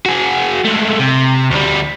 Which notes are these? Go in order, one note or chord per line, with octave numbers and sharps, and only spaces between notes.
F#4 G#4
G#3 A3
C3
D2 G3